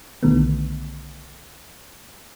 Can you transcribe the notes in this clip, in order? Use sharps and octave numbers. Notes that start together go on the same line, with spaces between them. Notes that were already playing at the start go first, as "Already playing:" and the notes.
B1 D3 D#3 A3 B3